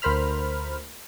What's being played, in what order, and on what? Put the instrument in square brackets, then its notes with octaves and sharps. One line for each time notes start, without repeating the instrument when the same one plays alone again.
[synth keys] D2 A#4 C5 B5 F6